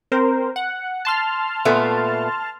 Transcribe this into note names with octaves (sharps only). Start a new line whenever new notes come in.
C4 A#4 C5
F#5
A5 C6 F6
A#2 A3 B3